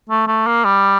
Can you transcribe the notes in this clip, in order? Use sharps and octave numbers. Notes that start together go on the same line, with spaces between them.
A3
A3
A#3
G3